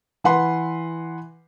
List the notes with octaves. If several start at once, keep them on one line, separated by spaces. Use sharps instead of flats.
E3 B4 F#5 B5 C6